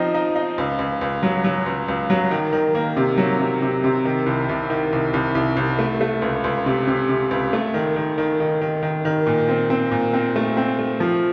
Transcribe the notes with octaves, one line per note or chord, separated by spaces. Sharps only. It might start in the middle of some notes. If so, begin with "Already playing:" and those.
Already playing: F3 C4 D#4
D#4
D#4
C#2
C#2
C#2
F#3
F#3
C#2
C#2
F#3
D#3
D#3
A#3
C3
F#3
C3
C3
C3
D#3
C2
C2
D#3
C2
C2
C2
C2
A3
A3
C#2
C#2
C3
C3
C3
C#2
A3
D#3
D#3
D#3
D#3
D#3
D#3
D#3
A#2
C4
C4
A#2
C4
A3
C4
A3
F3